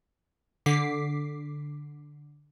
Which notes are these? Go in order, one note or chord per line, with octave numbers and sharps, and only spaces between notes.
D3 D6 B6 C7